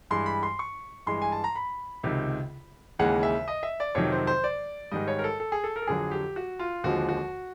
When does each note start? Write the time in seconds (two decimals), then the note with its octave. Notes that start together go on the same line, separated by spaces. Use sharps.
0.10 G2 E3 G#3 C6
0.26 B5
0.43 C6
0.59 C#6
1.07 G2 E3 G#3 C6
1.22 G#5
1.32 A5
1.44 A#5
1.55 B5
2.03 C#2 C3 D#3
2.99 D#2 C#3 E3 G#3 F#5
3.23 E5
3.48 D#5
3.63 E5
3.80 D5
3.95 F2 C3 D#3 F#3 C#5
4.12 C5
4.27 C5
4.44 D5
4.92 G#2 D#3 G3 D#5
5.08 C#5
5.19 A#4
5.24 A4
5.40 A4
5.52 G#4
5.64 A4
5.76 A#4
5.82 A4
5.87 F2 D3 F#3 G#4
6.11 G4
6.36 F#4
6.59 F4
6.84 D#2 D3 F3 G#3 F#4
7.09 F#4